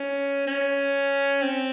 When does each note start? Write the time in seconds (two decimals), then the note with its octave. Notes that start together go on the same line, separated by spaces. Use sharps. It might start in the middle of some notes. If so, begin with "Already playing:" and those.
Already playing: C#4
0.47 C#4
1.42 C4